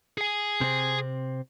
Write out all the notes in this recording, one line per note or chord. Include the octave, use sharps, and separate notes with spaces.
G#4 G#5
C3 C4